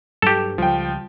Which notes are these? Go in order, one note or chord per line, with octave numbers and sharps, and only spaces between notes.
G2 F#3 G4 A4
C#2 F3 G3 G5